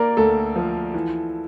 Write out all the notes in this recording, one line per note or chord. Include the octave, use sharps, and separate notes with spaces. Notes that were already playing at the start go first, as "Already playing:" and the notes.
Already playing: A#3 A#4 D5
D2 A4
F3
E3